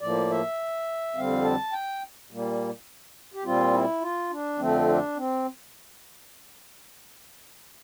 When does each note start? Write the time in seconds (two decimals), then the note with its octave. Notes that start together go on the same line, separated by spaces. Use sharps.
0.01 A2 F3 A#3 D5
0.30 E5
1.15 F2 D3 G3 C4 F5
1.44 A5
1.73 G5
2.31 A#2 G3 A#3
3.34 G4
3.45 A#2 G3 C4 F4
3.73 E4
4.01 F4
4.31 D4
4.59 F2 D3 F3 A3 C4
4.87 D4
5.17 C4